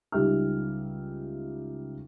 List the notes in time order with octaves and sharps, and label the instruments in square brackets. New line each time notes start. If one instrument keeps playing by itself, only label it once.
[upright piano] C#2 G3 D#4 G4 E5 F6